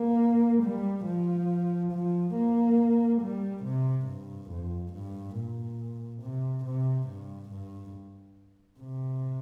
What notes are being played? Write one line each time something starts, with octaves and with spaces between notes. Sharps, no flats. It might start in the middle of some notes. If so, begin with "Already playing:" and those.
Already playing: A#3
G3
F3
F3
A#3
G3
C3
G2
F2
G2
A#2
C3
C3
G2
G2
C3